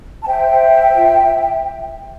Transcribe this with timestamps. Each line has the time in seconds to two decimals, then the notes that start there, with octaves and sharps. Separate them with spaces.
0.23 A5
0.27 C5 E5 G5
0.51 C5
0.72 C5
0.96 F4